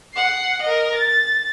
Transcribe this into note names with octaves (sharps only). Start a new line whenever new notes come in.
F#5 C7
A#4 D#5
A6